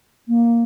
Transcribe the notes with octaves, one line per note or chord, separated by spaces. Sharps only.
A#3